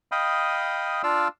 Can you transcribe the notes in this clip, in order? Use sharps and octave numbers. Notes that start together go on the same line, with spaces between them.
D#5 F5 G5 B5 D#6
D4 F4 D5 F5 E6